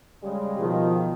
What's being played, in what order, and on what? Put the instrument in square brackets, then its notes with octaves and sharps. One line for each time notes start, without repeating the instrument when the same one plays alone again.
[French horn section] C#3 G#3 [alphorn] G3
[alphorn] B2 [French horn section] D#3 [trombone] F3